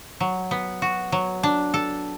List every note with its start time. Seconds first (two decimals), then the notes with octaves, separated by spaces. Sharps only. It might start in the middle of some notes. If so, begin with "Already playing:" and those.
0.20 F#3
0.51 B3
0.82 F#4
1.12 F#3
1.43 D4
1.74 A4